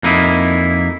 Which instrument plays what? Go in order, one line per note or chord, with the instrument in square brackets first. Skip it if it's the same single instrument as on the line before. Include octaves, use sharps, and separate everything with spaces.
[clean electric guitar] F2 A#3 D#4 E4